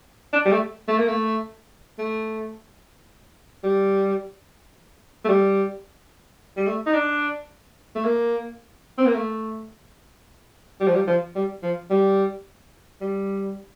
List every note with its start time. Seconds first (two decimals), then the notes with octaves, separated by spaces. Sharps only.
0.33 D4
0.46 G3
0.52 A3
0.88 A3
0.98 A#3
1.08 A3
1.99 A3
3.64 G3
5.25 A3
5.29 G3
6.57 G3
6.67 A3
6.86 D#4
6.94 D4
7.96 A3
8.05 A#3
8.98 C4
9.06 A#3
9.15 A3
10.80 G3
10.87 F3
10.96 G3
11.08 F3
11.36 G3
11.63 F3
11.90 G3
13.01 G3